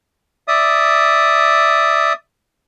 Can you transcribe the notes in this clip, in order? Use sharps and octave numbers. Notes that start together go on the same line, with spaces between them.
D5 E5 D#6